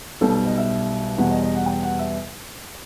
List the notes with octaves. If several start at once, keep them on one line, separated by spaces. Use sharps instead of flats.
B1 B2 G3 A4
D#5
E5
E2 B2 G3 F#5
D#5
D#5
F#5
G5
F#5
E5